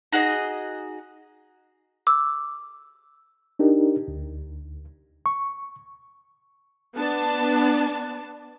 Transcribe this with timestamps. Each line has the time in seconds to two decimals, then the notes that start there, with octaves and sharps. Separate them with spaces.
0.12 D#4 F#4 G#4 D#5
2.07 D6 E6
3.59 D4 D#4 G4 A#4
4.08 D2
5.26 C#6
6.95 B3 D4 A5